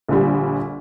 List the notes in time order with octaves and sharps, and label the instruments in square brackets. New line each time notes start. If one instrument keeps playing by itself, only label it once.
[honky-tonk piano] A#1 D3 G3